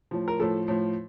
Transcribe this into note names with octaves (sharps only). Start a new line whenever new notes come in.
A2 F3
A#4
A2 F3 A4
A2 F3